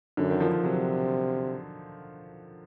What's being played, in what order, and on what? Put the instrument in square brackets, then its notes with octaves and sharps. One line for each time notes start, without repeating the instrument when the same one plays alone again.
[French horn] F#2 [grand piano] D3
[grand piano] D#3
F3
F3
[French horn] C3 [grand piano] F#3